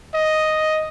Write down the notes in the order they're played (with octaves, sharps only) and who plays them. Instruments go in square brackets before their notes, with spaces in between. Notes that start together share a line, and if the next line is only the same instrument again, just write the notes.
[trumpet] D#5